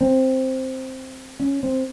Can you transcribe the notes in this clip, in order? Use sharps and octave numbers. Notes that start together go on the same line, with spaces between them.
C4
C#4
C4